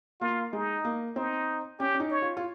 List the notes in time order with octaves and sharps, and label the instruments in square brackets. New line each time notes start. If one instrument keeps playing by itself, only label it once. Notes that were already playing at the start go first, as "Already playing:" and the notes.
[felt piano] A#3 [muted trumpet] F4
[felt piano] G#3 [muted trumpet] D#4
[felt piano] A#3
[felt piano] C4 [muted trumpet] D#4
[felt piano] C#4 [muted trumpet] G4
[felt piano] C#4
D#4
[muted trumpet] C#5
[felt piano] F4
F4